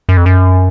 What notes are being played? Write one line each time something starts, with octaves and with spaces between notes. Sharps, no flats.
F#2
F2
F#2